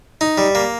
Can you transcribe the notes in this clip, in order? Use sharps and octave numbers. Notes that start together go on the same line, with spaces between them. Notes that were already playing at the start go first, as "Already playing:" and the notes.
D#4
G3
A#3